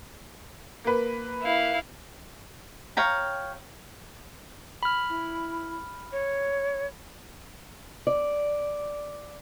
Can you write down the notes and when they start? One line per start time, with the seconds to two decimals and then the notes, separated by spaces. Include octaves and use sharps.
0.84 A#3 B4
1.42 E4 F5
2.97 C#5 F5 G5 A#5
4.83 B5 F6
5.09 E4
6.12 C#5
8.07 D5